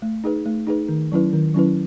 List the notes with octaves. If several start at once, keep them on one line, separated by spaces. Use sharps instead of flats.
A3
D#4 G#4 B4
A3
D#4 G#4 B4
D#3
F#3 C#4 E4 B4
D#3
F#3 C#4 E4 B4